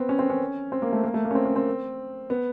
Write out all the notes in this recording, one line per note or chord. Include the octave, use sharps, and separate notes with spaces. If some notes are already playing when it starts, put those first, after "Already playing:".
Already playing: B3 C4
C#4
C4
C#4
C4
A#3
A3
A#3
A3
A#3
C#4
C4
C#4
C4
B3